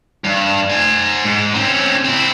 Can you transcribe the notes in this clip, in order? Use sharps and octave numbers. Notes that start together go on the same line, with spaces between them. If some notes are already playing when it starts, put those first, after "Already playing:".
G2
C5 G#5
G#2
C4 C#4
C4 E4